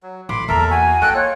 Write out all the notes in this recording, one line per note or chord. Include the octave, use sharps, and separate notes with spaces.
F#3
A1 B5 C6 D6
E2 A#3 A4 A#4 E5 A#5
F#4 G#5
A#3 A4 D#5 G5 F#6
F4 C#5